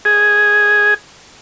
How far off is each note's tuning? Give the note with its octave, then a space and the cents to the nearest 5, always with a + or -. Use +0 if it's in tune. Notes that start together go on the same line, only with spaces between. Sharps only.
G#4 +0